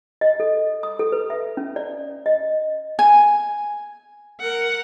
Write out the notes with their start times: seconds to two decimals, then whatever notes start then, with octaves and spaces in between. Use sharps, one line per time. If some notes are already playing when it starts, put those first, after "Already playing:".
0.21 D#5
0.40 A4
0.83 D#6
0.99 A4
1.12 B4
1.30 E5
1.57 C#4
1.76 D5
2.26 D#5
2.99 G#5
4.41 A#4 F#5